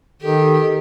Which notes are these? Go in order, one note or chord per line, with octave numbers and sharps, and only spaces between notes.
D#3 G4 A4